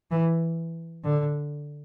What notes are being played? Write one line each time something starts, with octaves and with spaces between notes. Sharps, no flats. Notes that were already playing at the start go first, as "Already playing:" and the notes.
E3
D3